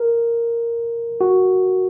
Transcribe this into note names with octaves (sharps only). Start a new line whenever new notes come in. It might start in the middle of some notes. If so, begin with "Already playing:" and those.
Already playing: A#4
F#4